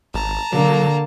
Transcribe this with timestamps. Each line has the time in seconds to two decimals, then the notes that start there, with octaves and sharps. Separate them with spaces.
0.14 G#1 A5 A#5
0.52 D3 F#3 A#3